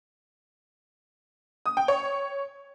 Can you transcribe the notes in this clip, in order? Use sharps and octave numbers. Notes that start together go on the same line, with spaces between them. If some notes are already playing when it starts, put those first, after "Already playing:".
D#6
G5
C#5